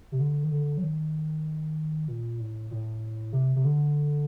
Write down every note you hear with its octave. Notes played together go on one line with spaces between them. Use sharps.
C3
D3
D#3
D3
F#3
D#3
A#2
A2
A2
C3
C3
D3